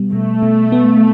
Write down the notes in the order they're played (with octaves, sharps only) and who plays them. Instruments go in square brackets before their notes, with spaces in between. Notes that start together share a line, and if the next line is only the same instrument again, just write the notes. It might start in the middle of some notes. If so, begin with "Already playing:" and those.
Already playing: [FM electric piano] B2 G3 B3
[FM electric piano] B2 [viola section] A3
[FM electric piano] B2
B3